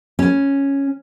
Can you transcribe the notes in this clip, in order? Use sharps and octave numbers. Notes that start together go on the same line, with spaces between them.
C#4